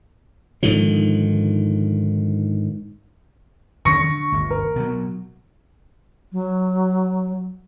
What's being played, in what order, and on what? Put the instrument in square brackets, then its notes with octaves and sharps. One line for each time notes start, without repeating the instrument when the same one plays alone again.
[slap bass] G#2 D3 D#3 F3
[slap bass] D#1 D3 C#4 [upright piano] C#6 A#6 C#7
[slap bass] D3
G1 D2
[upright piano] A#4
[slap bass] B2 F#3
[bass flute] F#3